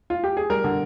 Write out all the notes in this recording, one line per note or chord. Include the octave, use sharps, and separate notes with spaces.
F4
G4
G#4
G3 A#4
D3